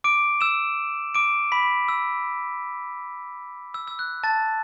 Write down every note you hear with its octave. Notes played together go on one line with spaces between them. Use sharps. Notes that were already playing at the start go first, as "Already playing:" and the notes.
D6 D7
E6 E7
D6 D7
B5 B6
E6
E6
E6
F#6
A5 A6